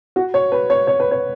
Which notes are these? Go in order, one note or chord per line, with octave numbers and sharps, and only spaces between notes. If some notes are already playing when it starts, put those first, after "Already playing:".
F#4
C#5
B4
C#5
C#5
B4
C#5